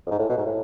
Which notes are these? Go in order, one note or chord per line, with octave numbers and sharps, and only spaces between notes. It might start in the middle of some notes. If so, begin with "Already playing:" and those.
F2
G#2
A2
B2
G#2
A2